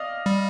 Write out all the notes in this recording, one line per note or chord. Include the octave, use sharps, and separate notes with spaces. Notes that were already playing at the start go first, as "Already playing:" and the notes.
Already playing: D5 D#5 F5
G3